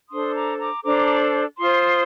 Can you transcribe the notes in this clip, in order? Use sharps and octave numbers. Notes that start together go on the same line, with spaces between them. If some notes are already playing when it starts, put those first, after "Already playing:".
D4 A4 C5 C6 D#6
A#5 D6
A#5 D6
D4 A4 C5 A#5 D6
F4 C5 C6 D#6